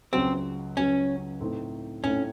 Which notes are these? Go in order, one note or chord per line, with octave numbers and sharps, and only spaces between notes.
C#2 C#3 F#3 C4
C#2 C#3 F#3 C#4
A2 A3 C4 D#4
A2 A3 C4 C#4 D#4